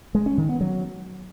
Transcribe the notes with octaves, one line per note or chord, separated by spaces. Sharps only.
G#3
C#4
D#3
B3
F#3